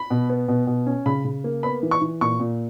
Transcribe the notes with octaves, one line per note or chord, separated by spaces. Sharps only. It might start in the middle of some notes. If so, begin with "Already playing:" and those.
Already playing: B5
B2
B3
B2
B2
C#4
C#3 B5
C#3
A#3
B3 B5
E3
C#6
E3
A#2 C#6
A#2